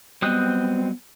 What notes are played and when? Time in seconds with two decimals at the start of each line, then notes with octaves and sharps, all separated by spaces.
0.22 F#3 G3 B3 C4 D#5 D#6 F#6